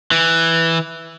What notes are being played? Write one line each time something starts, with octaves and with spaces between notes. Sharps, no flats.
E3